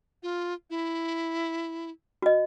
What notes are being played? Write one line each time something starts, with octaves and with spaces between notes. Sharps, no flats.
F4
E4
F#4 D#5